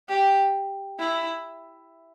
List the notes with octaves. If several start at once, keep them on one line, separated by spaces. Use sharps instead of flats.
G4
E4